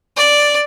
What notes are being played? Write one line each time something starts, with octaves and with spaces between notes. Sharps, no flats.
D5